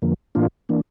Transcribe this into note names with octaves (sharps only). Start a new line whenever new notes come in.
F2 D3 F3 A#3
A2 E3 A#3 D4 F4
E3 A#3 D4